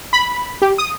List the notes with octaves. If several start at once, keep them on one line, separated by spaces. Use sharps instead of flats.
B5
G4
D#6